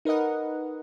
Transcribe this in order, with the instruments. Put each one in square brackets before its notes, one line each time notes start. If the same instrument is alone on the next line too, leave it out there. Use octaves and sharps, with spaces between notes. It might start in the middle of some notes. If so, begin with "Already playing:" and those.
[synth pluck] D#4 A#4 B4 D#5 F#5